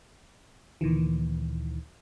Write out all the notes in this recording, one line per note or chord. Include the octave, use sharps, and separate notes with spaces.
D2 A#2 D#3 E3